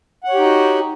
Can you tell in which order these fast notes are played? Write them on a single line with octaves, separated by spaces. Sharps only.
F#5 C#5 G4 D#4 F#4